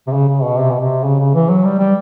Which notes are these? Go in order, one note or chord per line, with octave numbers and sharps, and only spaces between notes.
C3
C#3
C#3
B2
C3
B2
C3
C#3
C#3
E3
F#3
G3
G3